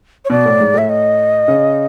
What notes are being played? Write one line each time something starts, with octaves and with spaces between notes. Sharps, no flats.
C#5
B2 D5
A2
G#2
A2 E5
D#5
C#3